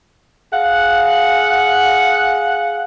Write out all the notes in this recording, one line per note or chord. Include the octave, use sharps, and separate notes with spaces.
G#4 F5 F#5